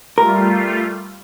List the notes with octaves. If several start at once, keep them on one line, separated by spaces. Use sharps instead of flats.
G3 A3 F4 A#4